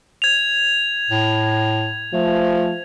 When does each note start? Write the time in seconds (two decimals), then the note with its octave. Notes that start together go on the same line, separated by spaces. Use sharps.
0.22 G#6 F7
1.10 A2
2.13 F3 A3